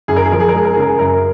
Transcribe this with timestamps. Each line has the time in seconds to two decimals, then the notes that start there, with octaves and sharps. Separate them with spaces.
0.08 F#2 G#4
0.16 A#4
0.25 G#4
0.32 F3 A#4
0.40 G#4
0.49 A#4
0.54 G#3 G#4
0.65 A#4
0.73 G#4
0.77 C#3 A#4
0.88 G#4
0.99 F#2 A#4